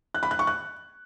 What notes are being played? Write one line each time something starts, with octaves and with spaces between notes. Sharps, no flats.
F#6
B5
F#6
C#6
F#6